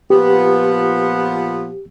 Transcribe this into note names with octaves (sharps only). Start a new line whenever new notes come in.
A#2 F3 B3 G4